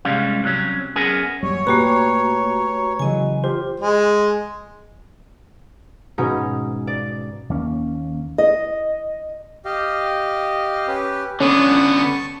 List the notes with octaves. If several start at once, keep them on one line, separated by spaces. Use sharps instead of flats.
G#2 C3 G3 G#3 C#4 F5
C2 C3 D#3 F#3 C#4
F#2 B3 C#4 G#4 A#4 G#5
D#1 F#2 G3 C#5
A#2 A3 F#4 G4 B4 A#5
C#3 E3 F#3 D#5 G#5
F4 G4 C5
G#3
G#2 B2 C#4 D#4 G6
D5
D#2 A#3 C#4
D#5
G4 D#5 F5
C#4 G4 B4
D3 B3 C#4 A5 C#6